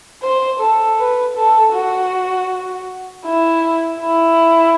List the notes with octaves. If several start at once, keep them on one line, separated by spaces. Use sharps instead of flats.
C5
A4
B4
A4
F#4
E4
E4